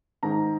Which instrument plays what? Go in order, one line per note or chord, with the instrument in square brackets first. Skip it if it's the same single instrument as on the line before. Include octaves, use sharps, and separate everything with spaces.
[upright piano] G#2 D#3 A#5